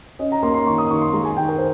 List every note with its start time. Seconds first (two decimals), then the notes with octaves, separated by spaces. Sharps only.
0.19 C#4 D#5
0.32 A#5
0.43 A#3 C6
0.54 C6
0.67 D#3 C#6
0.78 D#6
0.90 D#3 C#6
1.02 C6
1.13 G#3 A#5
1.25 G#5
1.36 D#3 G5
1.49 A#4
1.58 C5